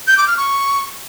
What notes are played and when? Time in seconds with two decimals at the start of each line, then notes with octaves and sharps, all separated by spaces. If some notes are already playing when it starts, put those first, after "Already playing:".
0.08 G6
0.18 D6
0.28 F6
0.37 C#6